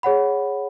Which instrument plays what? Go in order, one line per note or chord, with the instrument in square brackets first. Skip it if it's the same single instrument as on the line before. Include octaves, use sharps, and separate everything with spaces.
[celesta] G#4 C#5 F#5 B5